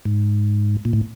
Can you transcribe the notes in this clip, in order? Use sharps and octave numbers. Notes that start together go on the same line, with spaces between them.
G#2
A#2
A2